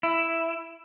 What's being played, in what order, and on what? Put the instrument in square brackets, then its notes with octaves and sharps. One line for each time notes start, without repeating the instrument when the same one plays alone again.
[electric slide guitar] E4